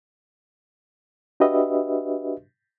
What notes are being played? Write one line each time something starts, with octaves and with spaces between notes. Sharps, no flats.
D4 F#4 G4 B4 D#5 E5